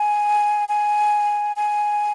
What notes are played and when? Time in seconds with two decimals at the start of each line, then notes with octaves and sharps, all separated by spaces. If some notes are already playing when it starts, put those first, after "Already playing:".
Already playing: G#5
0.69 G#5
1.56 G#5